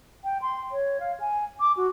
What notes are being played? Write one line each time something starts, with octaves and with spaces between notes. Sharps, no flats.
G5
C6
C#5
F5
G#5
D6
F#4